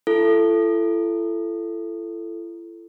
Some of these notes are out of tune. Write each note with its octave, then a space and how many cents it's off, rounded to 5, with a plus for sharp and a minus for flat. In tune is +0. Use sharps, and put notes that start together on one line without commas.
E4 +40 A4 +0